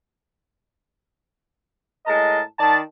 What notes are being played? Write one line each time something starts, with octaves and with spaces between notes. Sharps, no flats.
A2 G#3 A#4 D#5 A5
D#3 D5 A5